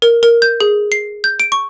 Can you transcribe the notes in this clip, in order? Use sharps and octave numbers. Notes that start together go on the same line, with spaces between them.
A#4
A#4
G6
G#4
C7
G6
D7
C#6